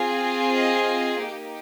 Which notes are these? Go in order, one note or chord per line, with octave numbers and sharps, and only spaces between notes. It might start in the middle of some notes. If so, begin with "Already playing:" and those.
Already playing: C4 F4 G#4
D#5
A#3 D#4 G4